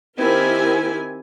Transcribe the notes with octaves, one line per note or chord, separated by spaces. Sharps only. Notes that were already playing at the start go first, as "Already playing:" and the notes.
D#3 C4 E4 G4 A#4 G#5